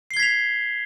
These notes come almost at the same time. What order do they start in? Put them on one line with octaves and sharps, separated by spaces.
C7 G7 G#6 B6 F7